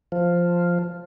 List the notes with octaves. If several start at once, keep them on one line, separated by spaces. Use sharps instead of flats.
F3